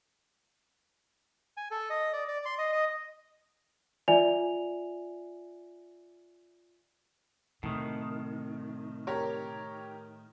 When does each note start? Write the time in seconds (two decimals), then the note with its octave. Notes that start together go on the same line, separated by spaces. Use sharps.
1.57 G#5
1.71 A4
1.90 D#5
2.13 D5
2.28 D5
2.45 C6
2.58 D#5
2.72 D#5
4.08 F4 D5 E5 G#5 F7
7.63 A2 C3 D#3
9.07 G4 A#4 C#5